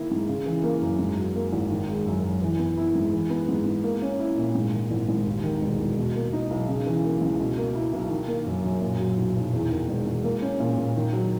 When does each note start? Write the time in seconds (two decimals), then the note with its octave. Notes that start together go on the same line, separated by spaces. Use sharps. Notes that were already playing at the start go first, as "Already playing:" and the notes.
Already playing: D#3 A#3 E4
0.11 G#2
0.28 C#3
0.46 E3
0.64 A#3
0.81 F#2
0.99 G#2
1.17 F#3
1.35 A#3
1.53 G#1
1.71 D#3
1.89 G#3
2.06 F#2
2.24 F#2
2.42 E3
2.59 B3
2.78 E4
2.95 G#2
3.13 E3
3.30 B3
3.48 G#2
3.66 G#2
3.84 A#3
4.02 C#4
4.19 E4
4.37 A#2
4.55 G#2
4.73 D#3
4.91 G#1
5.09 G#1
5.26 D#2
5.44 D#3
5.62 E1
5.79 E1
5.97 B2
6.16 A#3
6.33 D#4
6.51 B1
6.68 C#3
6.87 E3
7.05 A#3
7.21 C#2
7.40 B2
7.57 A#3
7.75 E4
7.93 B1
8.10 D#3
8.28 A#3
8.46 F#2
8.64 F#2
8.82 A#2
9.00 F#3
9.17 B1
9.36 B1
9.53 E2
9.71 D#3
9.88 E1
10.07 E1
10.24 A#3
10.42 C#4
10.60 A#2
10.77 A#2
10.96 D#3
11.13 F#3